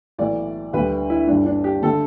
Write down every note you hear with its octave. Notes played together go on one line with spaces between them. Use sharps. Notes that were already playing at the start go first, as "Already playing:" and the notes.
B1 A2 E3 A3 D5
D2 D3 G3 B4
E4
G1 G2 G3 D4
D4
G4
D3 A3 A4